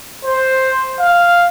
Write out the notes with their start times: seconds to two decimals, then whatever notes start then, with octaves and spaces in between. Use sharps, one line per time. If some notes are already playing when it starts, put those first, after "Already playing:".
0.25 C5
0.99 F5